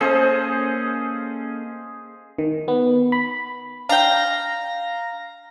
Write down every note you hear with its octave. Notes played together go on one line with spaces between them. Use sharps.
A#3 C#4 G#4 A4 C5 D#5
D#3
B3
B5
D4 F5 G5 A#5 A#6